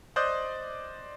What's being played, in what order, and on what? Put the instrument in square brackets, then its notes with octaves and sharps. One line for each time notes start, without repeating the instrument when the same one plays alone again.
[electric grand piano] C5 D5 D#5 D#6 F#6 G6